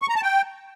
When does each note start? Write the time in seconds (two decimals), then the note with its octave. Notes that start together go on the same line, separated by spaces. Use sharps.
0.02 C#6
0.09 A#5
0.16 A5
0.23 G5